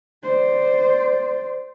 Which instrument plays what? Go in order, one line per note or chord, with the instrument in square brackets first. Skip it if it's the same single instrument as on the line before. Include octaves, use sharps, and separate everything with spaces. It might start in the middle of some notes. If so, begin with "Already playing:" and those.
[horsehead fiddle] C5 D5